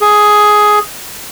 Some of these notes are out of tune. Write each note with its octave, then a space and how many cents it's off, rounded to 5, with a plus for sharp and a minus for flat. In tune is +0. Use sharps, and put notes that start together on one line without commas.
G#4 +10